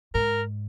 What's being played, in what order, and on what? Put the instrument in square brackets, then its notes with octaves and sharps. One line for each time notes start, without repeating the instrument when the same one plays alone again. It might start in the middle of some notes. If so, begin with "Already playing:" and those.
[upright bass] G#2 [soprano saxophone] A#4